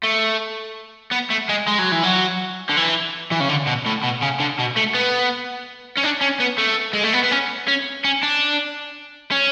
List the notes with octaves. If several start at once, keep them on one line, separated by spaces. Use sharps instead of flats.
A3
B3
A3
G#3
G#3
F#3
E3
F#3
D3
E3
E3
C#3
D3
B2
A2
B2
C#3
D3
B2
A3
B3
C#4
D4
C#4
B3
A3
G#3
A3
B3
B3
C#4
C#4
C#4
D4
C#4